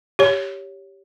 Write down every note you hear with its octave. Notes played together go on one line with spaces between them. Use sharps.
G4 C#5